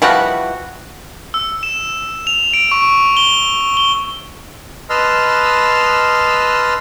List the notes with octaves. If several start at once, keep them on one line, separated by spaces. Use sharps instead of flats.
E3 F3 G3 F#4
E6
E7
F7
D7
C#6
G7
G7
B4 D#5 A5 C6 E6 F6